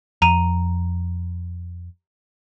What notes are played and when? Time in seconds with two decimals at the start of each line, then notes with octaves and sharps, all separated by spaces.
0.22 F2 A#5 D#7